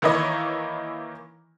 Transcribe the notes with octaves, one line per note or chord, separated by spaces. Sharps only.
D#3 E3 A#3 E4 C#5 D#5